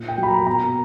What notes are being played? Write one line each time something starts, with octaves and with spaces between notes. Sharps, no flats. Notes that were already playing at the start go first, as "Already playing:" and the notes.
Already playing: A#2
G5
F#3
B5
A#5
B2 A#5